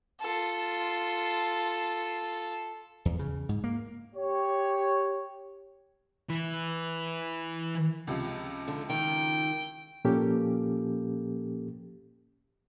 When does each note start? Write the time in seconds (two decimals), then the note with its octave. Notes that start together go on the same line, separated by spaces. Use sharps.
0.20 F4 A4
3.05 E2
3.19 C#3
3.49 G#2
3.64 A#3
4.16 G4 C#5
6.30 E3 E4
8.07 C#2 C3 F3
8.68 D3
8.90 D#3 G5
10.05 A#2 F3 A#3 C#4 G4 A4